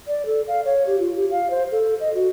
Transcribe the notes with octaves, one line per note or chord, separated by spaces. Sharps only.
D5
A4
F5
C#5
G4
F4
G4
F5
C5
A4
D#5
F#4